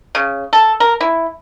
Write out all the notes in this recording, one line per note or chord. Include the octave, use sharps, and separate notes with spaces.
C#3
A4
A#4
E4